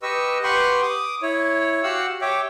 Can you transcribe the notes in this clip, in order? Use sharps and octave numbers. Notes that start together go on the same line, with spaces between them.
G4 B4 D#5 C#6 E6
G4 B4 F#5 G5 C6 C#6
D6 D#6
E4 C#5
F#4 G4 F5 F#5 E6
G4 C#5 E5 G5 D6